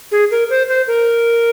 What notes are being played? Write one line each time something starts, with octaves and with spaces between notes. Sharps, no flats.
G#4
A#4
C5
C5
A#4